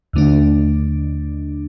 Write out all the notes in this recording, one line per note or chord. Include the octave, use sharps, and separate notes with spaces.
D#2 D3 A3 D4